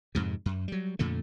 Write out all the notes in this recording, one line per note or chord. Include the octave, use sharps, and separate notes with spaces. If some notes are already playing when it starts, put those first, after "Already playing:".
F2 G#2 C3
F#2
F#3 G3
F2 A#2 D3 A3